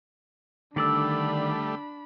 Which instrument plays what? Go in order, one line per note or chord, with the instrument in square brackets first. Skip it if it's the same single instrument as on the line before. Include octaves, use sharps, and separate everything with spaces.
[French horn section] D3 [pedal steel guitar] D#3 D5 E6 [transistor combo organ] G3 A3 [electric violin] D4 B5